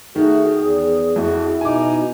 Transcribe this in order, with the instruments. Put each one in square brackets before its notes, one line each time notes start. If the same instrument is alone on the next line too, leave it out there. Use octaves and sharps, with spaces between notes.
[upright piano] D#3 [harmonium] A3 F#4 [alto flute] G#4
[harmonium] E2
[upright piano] F2 [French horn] E4 [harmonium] F#4
[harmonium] B2 D#4 [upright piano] G#5 D6